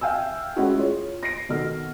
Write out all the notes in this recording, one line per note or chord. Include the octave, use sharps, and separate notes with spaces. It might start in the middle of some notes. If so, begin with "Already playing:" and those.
E5 F5 G5 G#5 E6
G#3 A3 C#4 E4 F#4 G#4
F4 G#4 C#5
A#6 C7 D7
B2 D#3 A4 F6